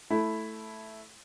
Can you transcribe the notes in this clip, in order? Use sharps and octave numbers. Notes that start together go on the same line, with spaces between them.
A3 E4